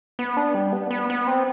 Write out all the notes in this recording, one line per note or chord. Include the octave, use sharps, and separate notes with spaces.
B3
D4
G3
B3
B3
B3
C4